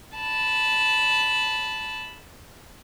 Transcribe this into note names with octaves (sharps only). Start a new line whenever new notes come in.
A5 B5